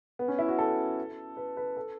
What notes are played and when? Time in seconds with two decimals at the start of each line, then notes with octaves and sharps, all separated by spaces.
0.19 B3
0.28 C#4
0.39 E4
0.48 F#4
0.59 A4
1.37 B4
1.57 B4
1.77 A4